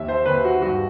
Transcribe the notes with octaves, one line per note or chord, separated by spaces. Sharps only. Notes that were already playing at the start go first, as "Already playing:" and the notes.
Already playing: D#2 E5
C5
D#2 B4
F#4
G2 F#4